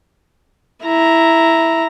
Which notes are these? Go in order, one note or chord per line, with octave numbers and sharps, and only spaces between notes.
E4 A#5